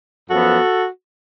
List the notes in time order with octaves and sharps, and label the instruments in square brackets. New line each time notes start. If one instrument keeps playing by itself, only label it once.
[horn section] F#2 F3 B3 F#4 A4